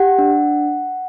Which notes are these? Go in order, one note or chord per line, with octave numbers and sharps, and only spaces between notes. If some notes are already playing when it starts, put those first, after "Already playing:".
Already playing: G4 F#5
D4